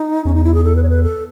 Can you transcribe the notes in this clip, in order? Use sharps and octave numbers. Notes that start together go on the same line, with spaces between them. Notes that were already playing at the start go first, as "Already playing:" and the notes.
Already playing: D#4
E2 C#4
D#4
E4
G#4
A4
B4
C#5
B4
A4